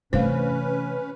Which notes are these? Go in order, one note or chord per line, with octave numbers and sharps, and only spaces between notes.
C3 E3 A3 C#4 B4 C5 F5